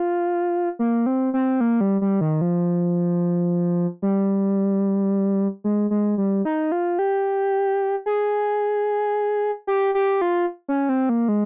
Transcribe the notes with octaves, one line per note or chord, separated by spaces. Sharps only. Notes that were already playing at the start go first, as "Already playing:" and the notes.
Already playing: F4
A#3
C4
C4
A#3
G3
G3
D#3
F3
G3
G#3
G#3
G3
D#4
F4
G4
G#4
G4
G4
F4
C#4
C4
A#3
G#3